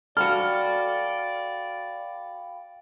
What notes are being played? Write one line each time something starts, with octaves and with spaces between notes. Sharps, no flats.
F#4 A4 D5 F5 G5 B5 F6